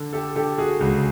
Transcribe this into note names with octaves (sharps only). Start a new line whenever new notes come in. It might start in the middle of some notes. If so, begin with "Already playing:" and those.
Already playing: D3
G4 A4
D3 G4 A4
F#4 G#4
C#2 F#4 G#4